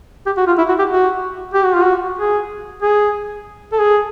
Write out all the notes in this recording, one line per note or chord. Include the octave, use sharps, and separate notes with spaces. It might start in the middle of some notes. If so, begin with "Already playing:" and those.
G4
F#4
F4
E4
F#4
G4
F#4
G4
F#4
F4
F#4
G#4
G#4
A4
G#4